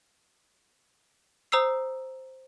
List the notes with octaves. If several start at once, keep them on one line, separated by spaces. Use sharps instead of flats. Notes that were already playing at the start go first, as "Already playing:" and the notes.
C5 A#5 D#6 E6 C7